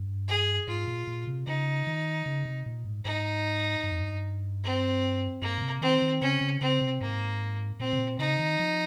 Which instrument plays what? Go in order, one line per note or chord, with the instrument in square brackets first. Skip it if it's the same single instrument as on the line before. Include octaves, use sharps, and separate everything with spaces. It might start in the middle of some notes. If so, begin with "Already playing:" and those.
Already playing: [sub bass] G2
[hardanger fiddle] G#4
[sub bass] G#2 [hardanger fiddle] F4
[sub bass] A#2
A#2
C3
[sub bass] C#3 [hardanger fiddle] D#4
[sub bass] D#3
C#3
C3
A#2
G#2
[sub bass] G#2 [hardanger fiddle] D#4
[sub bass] G2
F2
G2
[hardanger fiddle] C4
[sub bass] G2 [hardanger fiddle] A#3
[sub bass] A#2
C3
[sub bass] D#3 [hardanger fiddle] C4
[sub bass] D#3
[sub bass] C#3 [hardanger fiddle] C#4
[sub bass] C#3
[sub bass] C#3 [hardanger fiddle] C4
[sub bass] C3
[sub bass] G#2 [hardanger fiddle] A#3
[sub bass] A#2 [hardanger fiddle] C4
[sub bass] C3
A#2
[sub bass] C#3 [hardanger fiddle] D#4
[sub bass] D#3
F3